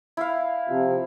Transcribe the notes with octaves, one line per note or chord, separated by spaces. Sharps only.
E4 F5
C3 F3